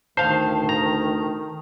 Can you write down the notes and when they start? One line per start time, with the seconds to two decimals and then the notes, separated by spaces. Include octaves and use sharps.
0.17 D2 D#3 C5 F5 A5
0.69 A#5